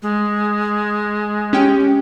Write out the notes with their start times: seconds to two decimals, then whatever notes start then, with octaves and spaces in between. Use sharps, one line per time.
0.02 G#3
1.53 C#4 G4 G5